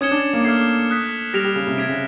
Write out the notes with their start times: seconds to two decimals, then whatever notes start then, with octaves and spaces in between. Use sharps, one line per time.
0.01 C#4 D#6 G#6 C#7 E7 G7
0.11 D4
0.33 A#3
0.45 A3 F6 G#6 C7
0.90 D#6 F#6 B6
1.33 G3 F6 A#6 D7 F7
1.44 G3
1.56 C#3
1.67 C3
1.78 C3 G#6 B6 D7 F7
1.89 C#3